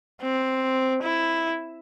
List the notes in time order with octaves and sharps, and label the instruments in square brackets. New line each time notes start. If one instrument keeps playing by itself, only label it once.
[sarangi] C4
E4